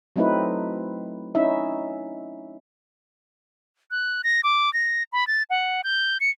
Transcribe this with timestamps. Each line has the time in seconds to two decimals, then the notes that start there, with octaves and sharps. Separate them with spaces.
0.16 F#3 A3 C4 D#4 E4 B4
1.35 C#4 D#4 E4 E5
3.91 F#6
4.24 A#6
4.44 D6
4.74 A#6
5.13 B5
5.27 A6
5.50 F#5
5.84 G6
6.20 C#7